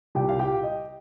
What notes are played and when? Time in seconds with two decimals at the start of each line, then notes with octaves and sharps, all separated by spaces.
0.15 C2 A#2 G3 G4 G5
0.29 F5
0.39 G4 G5
0.63 D#5